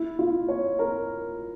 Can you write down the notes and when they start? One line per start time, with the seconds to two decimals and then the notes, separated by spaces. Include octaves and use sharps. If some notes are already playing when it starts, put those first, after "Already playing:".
Already playing: E4
0.19 F4
0.49 C#5
0.79 A#4